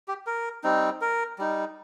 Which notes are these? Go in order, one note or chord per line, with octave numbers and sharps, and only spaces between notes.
G4
A#4
G3 C4 D#4
A#4
G3 D#4